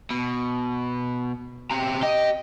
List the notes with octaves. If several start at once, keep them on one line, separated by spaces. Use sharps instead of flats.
B2
C4 G4 A#5
G4 D#5